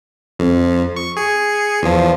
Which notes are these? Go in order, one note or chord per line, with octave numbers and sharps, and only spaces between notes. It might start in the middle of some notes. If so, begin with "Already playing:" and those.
F2
C#6
G#4 C#7
E2 F3